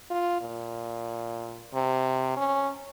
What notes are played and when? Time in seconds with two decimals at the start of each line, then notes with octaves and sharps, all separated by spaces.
0.10 F4
0.41 A#2
1.74 C3
2.37 C#4